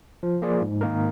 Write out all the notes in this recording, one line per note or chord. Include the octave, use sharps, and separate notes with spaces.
F3
A#3 F4 G#4 D5
G#2
D#3 A#3 D#4 A#4